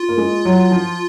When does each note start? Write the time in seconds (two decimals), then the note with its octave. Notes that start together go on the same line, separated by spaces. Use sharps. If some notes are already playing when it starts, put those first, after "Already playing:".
Already playing: F4
0.09 A#3
0.17 G#3
0.45 F#3
0.71 F3